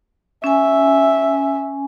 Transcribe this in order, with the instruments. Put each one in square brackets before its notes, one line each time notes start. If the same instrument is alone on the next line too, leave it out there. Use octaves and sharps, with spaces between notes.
[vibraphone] C#4 G#5 [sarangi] E5